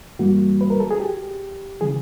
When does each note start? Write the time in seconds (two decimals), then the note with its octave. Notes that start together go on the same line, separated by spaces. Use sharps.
0.19 G2 E3 G3 A#3 F#4
0.61 B4
0.70 A#4
0.80 A4
0.91 G#4
1.00 G4
1.81 C#3 E3 G#4